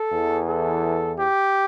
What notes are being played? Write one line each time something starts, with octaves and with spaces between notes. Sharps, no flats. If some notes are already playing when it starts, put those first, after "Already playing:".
Already playing: A4
E2 E3
A4
G4